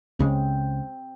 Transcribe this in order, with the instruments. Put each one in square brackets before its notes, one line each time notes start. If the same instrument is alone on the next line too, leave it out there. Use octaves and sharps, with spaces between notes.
[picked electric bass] C#2 C#3 G#3 [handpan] C4